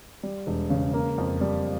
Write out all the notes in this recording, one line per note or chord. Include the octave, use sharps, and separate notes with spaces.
G3
E1
C#3
A#3
F2
G3